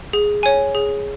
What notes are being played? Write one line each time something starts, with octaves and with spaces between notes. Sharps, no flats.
G#4
C#5 G#5
G#4